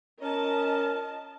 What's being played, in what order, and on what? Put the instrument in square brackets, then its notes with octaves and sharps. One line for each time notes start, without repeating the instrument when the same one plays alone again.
[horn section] C#4 A#4 [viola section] F4 D#5 A5